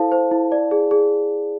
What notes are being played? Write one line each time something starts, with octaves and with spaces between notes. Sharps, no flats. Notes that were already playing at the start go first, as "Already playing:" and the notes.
Already playing: E4 A4 C5 F5 A5
C5
E4
D5
G#4
G#4